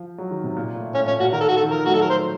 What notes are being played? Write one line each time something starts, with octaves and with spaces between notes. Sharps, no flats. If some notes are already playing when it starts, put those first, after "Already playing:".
Already playing: F3
F#3
D#3
C3
A#2
A2
A2 C#4
A#2 C#4
A#2 F#4
D#3 A#4
A4
F#4
A4
D#3
F3 A#4
A3 F#4
F#3 A4
A#4
C5